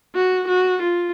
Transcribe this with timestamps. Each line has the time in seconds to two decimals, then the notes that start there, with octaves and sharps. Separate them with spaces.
0.15 F#4
0.48 F#4
0.82 F4